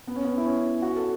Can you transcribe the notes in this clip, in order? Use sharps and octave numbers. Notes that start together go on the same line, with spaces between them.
B3
C#4
B3
E4
C#4
F#4
A4